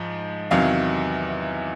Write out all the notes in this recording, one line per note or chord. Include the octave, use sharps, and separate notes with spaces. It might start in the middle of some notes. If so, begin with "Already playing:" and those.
Already playing: G#2 F3
E2 C3 D#3 F#3 F5